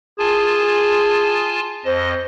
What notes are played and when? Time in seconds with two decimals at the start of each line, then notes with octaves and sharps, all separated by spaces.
0.19 F4 G#4 G#5 A5
1.85 F2 C5 D#5